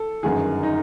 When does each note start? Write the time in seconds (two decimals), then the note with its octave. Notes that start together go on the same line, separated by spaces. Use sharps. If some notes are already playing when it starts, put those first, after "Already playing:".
Already playing: A4
0.23 G1 F#2 D#3 G#4
0.63 D#4